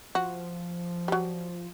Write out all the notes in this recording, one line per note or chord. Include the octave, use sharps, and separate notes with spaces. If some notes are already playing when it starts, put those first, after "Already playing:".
F3 F#4
F#3 G3